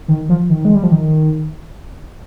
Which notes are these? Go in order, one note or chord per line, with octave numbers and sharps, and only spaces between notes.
D#3
F3
D#3
G#3
G3
F3
D#3